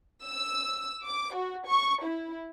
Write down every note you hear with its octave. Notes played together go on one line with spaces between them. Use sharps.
E6
D6
F#4
C#6
E4